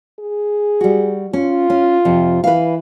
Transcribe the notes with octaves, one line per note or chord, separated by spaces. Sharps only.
G#4
G3 F#4
C#4 F4
C#4
F2 C3
E3 B4 F5